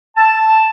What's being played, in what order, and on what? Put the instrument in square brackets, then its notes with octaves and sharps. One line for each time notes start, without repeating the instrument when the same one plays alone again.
[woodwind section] A5